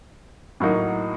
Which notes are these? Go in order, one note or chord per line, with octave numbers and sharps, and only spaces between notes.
A2 F#3 A#3 D#4 F#4